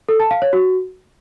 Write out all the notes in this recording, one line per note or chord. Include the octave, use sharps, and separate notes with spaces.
A4
A5
F5
C#5
F#4